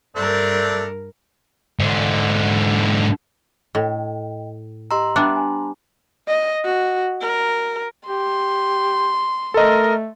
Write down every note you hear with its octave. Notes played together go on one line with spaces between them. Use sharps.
G2 A3 C4 D4 A#4
G#2 D3
A2 D#5 G5
G4 D#5 A#5 C6 E6
G3 B3 D4 E5
G#5
D#5
F#4
A#4
G4 C6
A3 A4 A#4 D#5